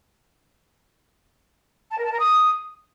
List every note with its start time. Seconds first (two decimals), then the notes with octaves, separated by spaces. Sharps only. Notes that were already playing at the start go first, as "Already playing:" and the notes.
1.91 A5
1.98 A#4
2.05 A5
2.12 A#4
2.19 D#6